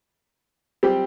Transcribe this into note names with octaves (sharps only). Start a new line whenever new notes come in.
G3 C4 G4